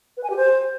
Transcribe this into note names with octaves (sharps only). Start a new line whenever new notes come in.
B4
G#5
G4
C5